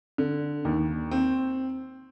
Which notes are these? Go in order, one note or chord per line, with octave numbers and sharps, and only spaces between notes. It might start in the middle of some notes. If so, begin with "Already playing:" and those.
D3
D#2
C4